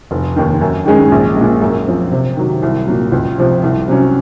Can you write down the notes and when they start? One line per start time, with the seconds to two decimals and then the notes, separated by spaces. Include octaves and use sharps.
0.11 F1
0.36 D#2 D#3
0.61 F#2
0.86 D#3 G#3 C#4 G#4
1.11 A#1
1.36 G#3
1.41 A#2
1.61 F#2
1.87 F3 C4
2.11 C3
2.37 D#3 F#3
2.62 C2
2.87 A#2 F#3
3.12 C#2
3.38 C3 F3
3.63 C2
3.88 C3 F#3 C#4